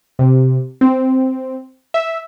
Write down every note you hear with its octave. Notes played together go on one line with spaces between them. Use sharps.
C3
C4
E5